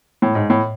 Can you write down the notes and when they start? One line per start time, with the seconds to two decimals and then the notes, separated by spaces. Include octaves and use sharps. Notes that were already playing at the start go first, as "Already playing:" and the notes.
0.22 A2
0.35 G#2
0.50 A2